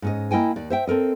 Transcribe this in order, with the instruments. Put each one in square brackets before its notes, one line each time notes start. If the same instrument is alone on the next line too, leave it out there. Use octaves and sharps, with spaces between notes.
[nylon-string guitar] G#2 C#4 D#5
A#3 E4 D#5 G5 G#5
D#2 D5
C5 E5 G5
C4 A4 A#4 D#5